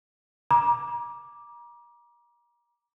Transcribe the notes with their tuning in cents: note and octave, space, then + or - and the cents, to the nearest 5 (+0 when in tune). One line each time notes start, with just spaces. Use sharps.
A#5 +35 D6 +0